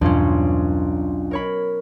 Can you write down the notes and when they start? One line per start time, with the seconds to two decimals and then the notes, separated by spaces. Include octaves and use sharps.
0.01 B1 E2 G2 B2 C#4 D4 F4
1.31 A#4 C#5 B5